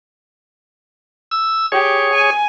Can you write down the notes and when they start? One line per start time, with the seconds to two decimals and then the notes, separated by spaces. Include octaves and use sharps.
1.31 E6
1.72 G4 G#4 C#5
2.14 G#5